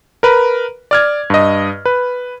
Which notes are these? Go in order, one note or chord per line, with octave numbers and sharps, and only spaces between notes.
A#4 B4
D5 F6 G#6
G2 D#5
B4